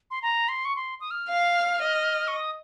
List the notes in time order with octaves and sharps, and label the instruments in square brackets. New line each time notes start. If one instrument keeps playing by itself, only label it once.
[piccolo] C6
A#5
C6
C#6
C6
D#6
F6
[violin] F5
D#5
[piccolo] C#6
D#6